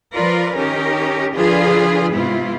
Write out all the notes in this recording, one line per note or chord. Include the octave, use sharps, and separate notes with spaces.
F3 F4 A#4 B4 D5
D#3 C#4 D#4 G4 A#4
D3 F3 D4 F4 G#4 B4
G#2 C3 B3 E4 F4